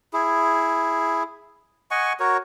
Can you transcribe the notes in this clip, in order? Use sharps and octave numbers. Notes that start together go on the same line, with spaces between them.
E4 G#4
D#5 F#5 G#5 C#6
F#4 A#4 C#5